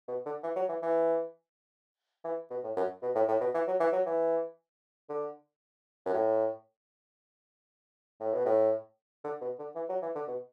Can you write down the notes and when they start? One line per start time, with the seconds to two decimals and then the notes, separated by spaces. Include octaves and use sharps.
0.08 B2
0.26 D3
0.43 E3
0.56 F#3
0.69 E3
0.82 E3
2.24 E3
2.50 B2
2.64 A2
2.76 F#2
3.02 B2
3.15 A2
3.28 A2
3.41 B2
3.54 E3
3.67 F#3
3.80 E3
3.93 F#3
4.06 E3
5.09 D3
6.06 F#2
6.13 A2
8.20 A2
8.33 B2
8.46 A2
9.24 D3
9.41 B2
9.59 D3
9.76 E3
9.89 F#3
10.02 E3
10.15 D3
10.28 B2